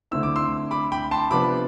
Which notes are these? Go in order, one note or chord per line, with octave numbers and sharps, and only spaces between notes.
D3 A3 C4 E4 E6
D6
C6 E6
B5 D6
G5 B5
A5 C6
C3 F3 B3 D4 B5 D6